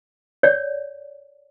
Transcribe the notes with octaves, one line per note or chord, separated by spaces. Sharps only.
C#5 D5